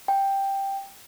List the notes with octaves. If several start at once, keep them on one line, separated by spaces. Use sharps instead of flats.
G5